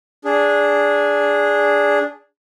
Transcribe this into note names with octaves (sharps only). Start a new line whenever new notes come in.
D4 G#4